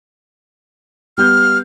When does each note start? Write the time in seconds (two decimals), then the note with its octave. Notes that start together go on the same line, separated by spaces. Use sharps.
1.18 G3 B3 F6 G6